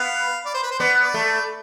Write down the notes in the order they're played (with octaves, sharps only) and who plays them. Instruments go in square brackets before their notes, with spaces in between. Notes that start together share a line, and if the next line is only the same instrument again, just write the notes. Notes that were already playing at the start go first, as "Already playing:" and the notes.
Already playing: [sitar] B3 [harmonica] F5
[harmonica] D5
C5
B4
C5
[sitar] B3 [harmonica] D5
[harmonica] D5
[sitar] A3